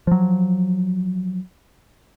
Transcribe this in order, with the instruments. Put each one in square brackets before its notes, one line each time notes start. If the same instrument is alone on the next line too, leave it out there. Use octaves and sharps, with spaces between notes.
[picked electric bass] F3 F#3